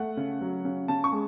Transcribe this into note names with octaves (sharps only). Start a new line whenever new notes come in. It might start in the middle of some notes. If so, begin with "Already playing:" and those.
Already playing: A3 F#5
C#3
F#3
C#3
C#3 A5
C#6
G#3